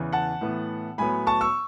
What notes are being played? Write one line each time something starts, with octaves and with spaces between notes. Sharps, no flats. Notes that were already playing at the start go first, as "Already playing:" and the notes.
Already playing: E2 C#3 E3
F#5 A5
A2 E3 B3
A2 F#3 B3 G#5 B5
A5 C#6
C#6 E6